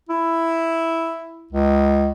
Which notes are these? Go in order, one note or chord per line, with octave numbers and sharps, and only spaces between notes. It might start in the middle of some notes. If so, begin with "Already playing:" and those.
E4
C#2